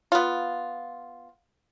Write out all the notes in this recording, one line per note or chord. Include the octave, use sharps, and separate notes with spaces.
B3 F4